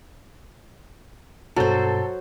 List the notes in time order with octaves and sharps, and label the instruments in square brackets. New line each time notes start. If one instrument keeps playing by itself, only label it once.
[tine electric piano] G2 B2 [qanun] F#3 C5 [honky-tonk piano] A4